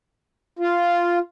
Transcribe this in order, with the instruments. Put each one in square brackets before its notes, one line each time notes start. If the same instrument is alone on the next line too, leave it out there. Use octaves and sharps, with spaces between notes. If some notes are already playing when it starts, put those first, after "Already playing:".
[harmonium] F4